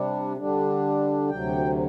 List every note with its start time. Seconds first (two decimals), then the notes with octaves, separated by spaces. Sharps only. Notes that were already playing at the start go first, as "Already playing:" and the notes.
Already playing: C3 G3 D4
0.37 D3 G3 D4
1.29 D2 C3 F#3 G5